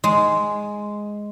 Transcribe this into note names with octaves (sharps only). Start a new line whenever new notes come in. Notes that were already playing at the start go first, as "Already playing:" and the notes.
G#3